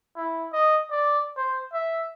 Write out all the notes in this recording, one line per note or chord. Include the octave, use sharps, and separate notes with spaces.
E4
D#5
D5
C5
E5